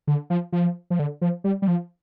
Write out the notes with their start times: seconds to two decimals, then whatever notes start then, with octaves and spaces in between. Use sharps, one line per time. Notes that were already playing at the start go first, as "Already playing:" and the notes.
0.07 D3
0.30 F3
0.52 F3
0.90 F3
0.99 D3
1.21 F3
1.44 G3
1.62 G3
1.68 F3